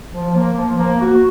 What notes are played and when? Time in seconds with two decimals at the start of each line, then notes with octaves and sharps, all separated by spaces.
0.12 F3
0.34 A#3
0.56 F3
0.78 A#3
1.01 F#4